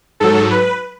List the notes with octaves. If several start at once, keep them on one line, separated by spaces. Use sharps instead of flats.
G#2 F#3 A4
B4